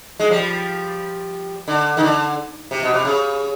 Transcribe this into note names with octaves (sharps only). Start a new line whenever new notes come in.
G#3
F3 G3
D3
D#3
D3
C3
B2
C3
C#3